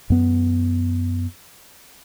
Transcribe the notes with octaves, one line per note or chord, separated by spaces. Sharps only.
F#2 B3